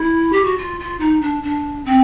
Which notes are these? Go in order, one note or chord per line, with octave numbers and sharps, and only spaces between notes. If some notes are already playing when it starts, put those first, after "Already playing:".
Already playing: E4
G4
F#4
F4
F4
D#4
D4
D4
C4